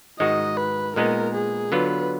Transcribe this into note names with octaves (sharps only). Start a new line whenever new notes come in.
G#2 D#3 G#3 D#4 F#4 D#5
B4
A#2 G#3 B3 D#4 A#4
G#4
D3 F#3 B3 F4 B4